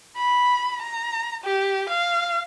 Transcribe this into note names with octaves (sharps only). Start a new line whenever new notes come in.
B5
A#5
G4
F5